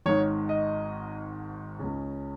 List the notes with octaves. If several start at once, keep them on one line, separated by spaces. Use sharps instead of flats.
G#1 G#2 D#3 C#5
D#5
C#2 C#3